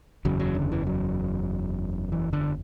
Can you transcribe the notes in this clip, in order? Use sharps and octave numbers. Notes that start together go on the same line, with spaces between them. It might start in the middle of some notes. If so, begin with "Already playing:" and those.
F#1 E2 C#3 F#3
F#3
D3
E3
F#3
E3
D3